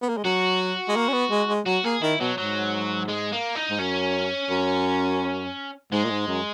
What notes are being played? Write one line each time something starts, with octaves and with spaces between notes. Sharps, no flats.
B3
A#3
G#3
F#3 F#4
G#3
A#3
C#4
B3
G#3
G#3
F#3 F#4
A#3 G#4
D#3 E4
B2 F#3
G#2 F#3
G#3
A#3
D#4
G#2
F#2 C#4
F#2
G#2 G#3
A#2
G#2
F#2